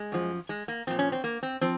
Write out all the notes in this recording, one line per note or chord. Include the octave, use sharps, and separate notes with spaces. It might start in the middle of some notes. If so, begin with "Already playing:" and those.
Already playing: G#3
F#2 F3
G#3
A#3
A#2 F3 C4
C#4
C4
A#3
C4
F3 C4